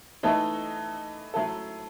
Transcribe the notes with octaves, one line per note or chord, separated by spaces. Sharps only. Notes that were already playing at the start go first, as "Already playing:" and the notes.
E3 A3 D#4 A4
F#3 A3 E4 A4